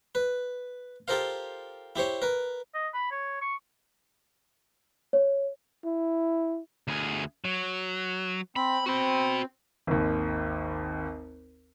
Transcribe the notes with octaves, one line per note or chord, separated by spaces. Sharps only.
B4
F4 G4 A4 A#4 C5 F5
E4 G4 C5 C#5
A#4 B4
D#5
B5
C#5
C#6
C#5
E4
D2 G#4
F#3
C4 B5
C4 F#4 B5
G#1 D#2